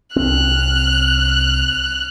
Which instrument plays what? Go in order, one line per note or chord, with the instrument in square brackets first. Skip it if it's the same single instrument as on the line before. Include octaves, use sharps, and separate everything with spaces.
[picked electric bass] C2 C4 [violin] F6 F#6